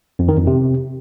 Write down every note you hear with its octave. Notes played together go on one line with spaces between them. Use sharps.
F2
D#3
F2
C3